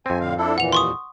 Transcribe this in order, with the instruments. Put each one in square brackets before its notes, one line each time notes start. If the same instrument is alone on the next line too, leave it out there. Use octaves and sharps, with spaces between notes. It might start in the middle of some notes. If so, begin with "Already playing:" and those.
[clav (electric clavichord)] F2 C4 [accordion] G#5
[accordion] A2 D3 F5
D4 E4 A4
[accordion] D#2 A#2 E3 [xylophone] F#5 F7
[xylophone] C6 C#6 D#6